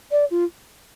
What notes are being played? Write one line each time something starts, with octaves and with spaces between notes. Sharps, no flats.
D5
F4